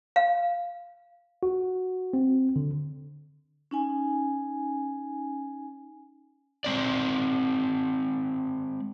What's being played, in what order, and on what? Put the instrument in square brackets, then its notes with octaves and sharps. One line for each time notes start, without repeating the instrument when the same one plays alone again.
[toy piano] F5
[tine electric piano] F#4
C4
D3
[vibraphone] C#4 D#4 G#5
[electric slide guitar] G#3 C4 D5